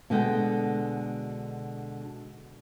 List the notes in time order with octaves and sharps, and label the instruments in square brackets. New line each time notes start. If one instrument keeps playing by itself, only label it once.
[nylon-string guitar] B2 D3 G#3 F#5 G5